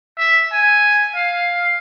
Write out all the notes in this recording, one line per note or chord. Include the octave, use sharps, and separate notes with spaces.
E5
G#5
F5